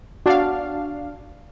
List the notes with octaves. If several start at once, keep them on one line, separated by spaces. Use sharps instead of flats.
D4 F#4 F5